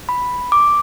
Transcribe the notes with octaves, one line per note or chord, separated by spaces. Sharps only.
B5
D6